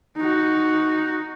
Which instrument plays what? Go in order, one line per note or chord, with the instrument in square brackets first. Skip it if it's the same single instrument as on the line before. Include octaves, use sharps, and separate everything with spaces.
[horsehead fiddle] D#4 F#4